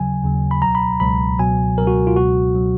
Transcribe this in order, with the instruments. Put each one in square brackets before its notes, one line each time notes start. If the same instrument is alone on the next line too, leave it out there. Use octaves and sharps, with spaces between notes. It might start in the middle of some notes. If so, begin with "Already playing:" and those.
Already playing: [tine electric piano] D#2 C#3 F#3 G#5
D#2 C#3 F#3
B5
C#2 B2 F#3 A#5
B5
C#2 B2 F#3 B5
C#2 B2 F#3 G#5
C#2 B2 F#3 A#4
F#4
F4
C#2 B2 F#3 F#4
B2 F#3